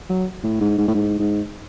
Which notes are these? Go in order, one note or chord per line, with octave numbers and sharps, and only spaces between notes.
F#3
A2
G#2
G#2
A2
G#2
G#2